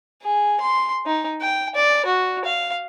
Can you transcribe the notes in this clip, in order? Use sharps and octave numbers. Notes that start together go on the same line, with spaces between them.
G#4
C6
D#4
G5
D5
F#4
F5